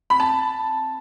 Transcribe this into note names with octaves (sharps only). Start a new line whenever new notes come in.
B5
A5